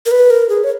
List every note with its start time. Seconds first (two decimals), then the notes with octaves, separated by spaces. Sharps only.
0.06 A#4
0.11 B4
0.30 A#4
0.49 G#4
0.64 C#5